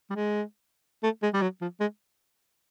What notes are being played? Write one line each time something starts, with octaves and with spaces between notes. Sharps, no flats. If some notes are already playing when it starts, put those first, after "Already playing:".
G3
G#3
A3
G#3
G3
F#3
F3
G#3